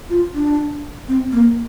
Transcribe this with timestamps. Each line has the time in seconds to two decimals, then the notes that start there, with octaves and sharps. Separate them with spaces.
0.10 F4
0.35 D4
1.08 C4
1.32 A#3